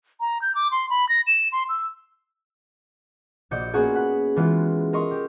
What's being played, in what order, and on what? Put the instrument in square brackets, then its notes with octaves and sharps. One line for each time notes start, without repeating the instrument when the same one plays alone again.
[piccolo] A#5
G6
D6
C6
B5
A#6
E7
C6
E6
[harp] A#1 F#4 D5 D#5 G6 C#7
A#3 B3 C#4 F4 F#4 G#4
F#5 B5 F#6
E3 G#3 B3 F4
A#4 D#5 C6 C#6
G4